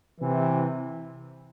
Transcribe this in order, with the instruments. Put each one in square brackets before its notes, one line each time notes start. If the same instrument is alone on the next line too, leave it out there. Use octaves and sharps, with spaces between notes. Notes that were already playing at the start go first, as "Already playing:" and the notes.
[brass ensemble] C3 E3